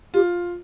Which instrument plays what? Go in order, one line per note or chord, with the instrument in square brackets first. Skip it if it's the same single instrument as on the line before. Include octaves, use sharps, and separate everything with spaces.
[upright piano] F4 [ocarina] G4